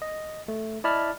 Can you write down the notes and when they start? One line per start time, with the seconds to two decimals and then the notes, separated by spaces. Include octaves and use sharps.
0.02 D#5
0.48 A3
0.84 E4 D5 D#5 A5 B5 F6